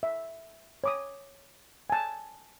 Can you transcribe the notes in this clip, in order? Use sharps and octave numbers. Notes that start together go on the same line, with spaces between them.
E5
C#5 D6 D#6
G#5 A5